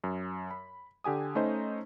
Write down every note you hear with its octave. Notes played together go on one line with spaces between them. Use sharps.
F#2
B5
D3 G4 G#5 D#6
A3 C#4 D#4 C5 D#5